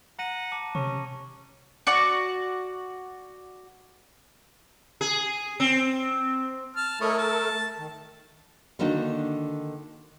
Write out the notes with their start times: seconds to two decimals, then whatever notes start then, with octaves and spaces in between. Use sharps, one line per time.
0.19 F#5 A#5 A#6 D#7
0.52 A5 D6
0.75 C3 C#4 C#6
1.87 F#4 D5 C#6
5.01 G#4
5.60 C4
6.76 A5 F6
7.01 A3 E4 A4 A#4 C#5 D#5
7.18 A5
7.79 D#3
8.79 D3 D#3 A#3 D4 D#4 F#4